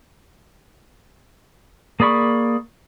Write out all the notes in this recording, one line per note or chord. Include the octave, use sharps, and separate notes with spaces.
A#3 G#4 D5 B5 C#6